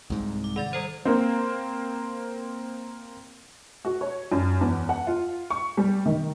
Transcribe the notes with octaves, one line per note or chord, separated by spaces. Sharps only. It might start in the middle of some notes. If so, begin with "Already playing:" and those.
C2 G#2
D6
D#3 D5 A6
G3 A4 C5
A#3 C4
F#4
C#5
F#2
E2
F#5
F4
C#6
G3
D#3